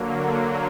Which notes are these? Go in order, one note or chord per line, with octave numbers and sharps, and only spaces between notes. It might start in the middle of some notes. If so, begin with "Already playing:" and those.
Already playing: D3 F#3 A#3